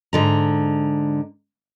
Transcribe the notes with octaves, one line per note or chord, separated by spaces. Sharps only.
G#2 D3 A#5